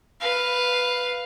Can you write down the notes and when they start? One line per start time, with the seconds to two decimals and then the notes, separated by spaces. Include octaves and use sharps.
0.21 B4 F5